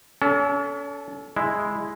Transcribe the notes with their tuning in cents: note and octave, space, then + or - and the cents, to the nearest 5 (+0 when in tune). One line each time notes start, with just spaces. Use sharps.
C#4 +40 A4 +0
G#3 +0 E4 +0